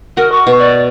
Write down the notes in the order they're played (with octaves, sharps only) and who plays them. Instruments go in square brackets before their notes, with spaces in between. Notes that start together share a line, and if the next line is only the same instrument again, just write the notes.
[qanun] F#4 D#5 [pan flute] A#4
[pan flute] C#6
[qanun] B2
[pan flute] D5